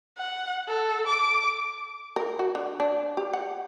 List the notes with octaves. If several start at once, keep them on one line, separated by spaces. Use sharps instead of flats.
F#5
A4
D6
A#4
F#4
D3
D4
G4
F#5